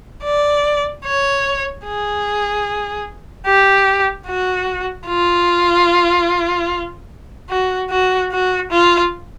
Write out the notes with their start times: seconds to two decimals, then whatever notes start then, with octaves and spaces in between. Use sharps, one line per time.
0.23 D5
1.04 C#5
1.85 G#4
3.46 G4
4.26 F#4
5.08 F4
7.49 F#4
7.90 F#4
8.31 F#4
8.71 F4